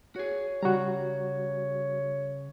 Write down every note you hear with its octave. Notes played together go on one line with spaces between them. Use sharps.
F#4 G#4 C#5
C#3 G3 F#4 A#5